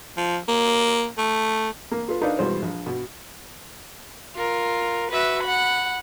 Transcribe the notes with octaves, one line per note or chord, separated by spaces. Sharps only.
F3
A#3
A3
A#3
F4 A4 B4
D4 D#4 A#4 B4 D5 F5
G2 B2 E3 G#3 C5 C6
A#1
B2
F4 A#4
F#4 B4 E5
F#5 B5